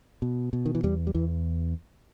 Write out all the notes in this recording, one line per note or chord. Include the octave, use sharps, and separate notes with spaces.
B2
B2
D#3
E3
E2 G3
G3
E2 E3